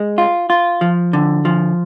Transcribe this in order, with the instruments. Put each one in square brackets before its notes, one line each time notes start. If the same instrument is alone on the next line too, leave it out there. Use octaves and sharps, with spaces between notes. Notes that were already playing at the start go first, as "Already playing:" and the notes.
Already playing: [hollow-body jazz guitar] G#3
F4
F4
F3
D3
F3